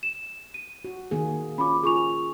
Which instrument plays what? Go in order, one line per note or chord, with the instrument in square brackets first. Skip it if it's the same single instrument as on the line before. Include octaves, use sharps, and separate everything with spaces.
[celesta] E7
D#7
[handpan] F#4
D#3 A#3 G#4
[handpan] C#4 F4 [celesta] B5 D6
[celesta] F4 C#6 F7 [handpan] G#4